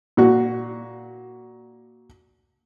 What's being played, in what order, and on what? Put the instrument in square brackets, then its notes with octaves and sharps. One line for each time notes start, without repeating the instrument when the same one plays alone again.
[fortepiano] A#2 F#4